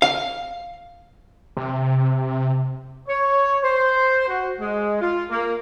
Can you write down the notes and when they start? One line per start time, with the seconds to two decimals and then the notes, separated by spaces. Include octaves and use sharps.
0.02 F5
1.57 C3
3.08 C#5
3.62 C5
4.28 F#4
4.60 G#3
5.00 F4
5.29 A#3